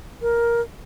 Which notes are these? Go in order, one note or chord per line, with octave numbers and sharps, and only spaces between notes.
A#4